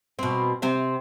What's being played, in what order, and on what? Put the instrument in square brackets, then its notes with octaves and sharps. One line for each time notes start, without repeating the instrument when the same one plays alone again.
[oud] B2 C4
C3 C4